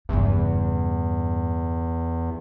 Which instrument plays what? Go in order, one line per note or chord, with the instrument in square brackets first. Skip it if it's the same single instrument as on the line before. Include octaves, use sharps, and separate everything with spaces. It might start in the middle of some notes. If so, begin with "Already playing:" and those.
[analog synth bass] E2 [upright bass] G2 C#3